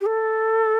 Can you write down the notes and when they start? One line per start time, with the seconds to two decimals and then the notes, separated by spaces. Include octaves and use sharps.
0.01 G4
0.06 A4